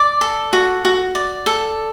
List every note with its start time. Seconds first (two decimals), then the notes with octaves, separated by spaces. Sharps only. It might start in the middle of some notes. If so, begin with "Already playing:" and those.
Already playing: D5 D6
0.21 A4
0.53 F#4
0.85 F#4
1.15 D5
1.46 A4